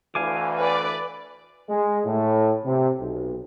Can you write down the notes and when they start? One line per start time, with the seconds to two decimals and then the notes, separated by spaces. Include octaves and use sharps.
0.15 D2 E3 F5 G#5 D6
0.59 B4 D5
1.70 G#3
2.06 A2
2.65 C3
3.00 B1